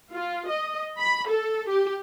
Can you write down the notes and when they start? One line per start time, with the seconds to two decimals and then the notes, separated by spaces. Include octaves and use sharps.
0.13 F4
0.48 D#5
0.99 B5
1.29 A4
1.69 G4